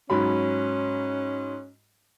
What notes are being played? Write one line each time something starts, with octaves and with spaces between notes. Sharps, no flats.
G#2 F#3 C#4 B5